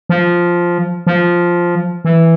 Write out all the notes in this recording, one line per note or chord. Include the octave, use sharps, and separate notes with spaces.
F3
F3
E3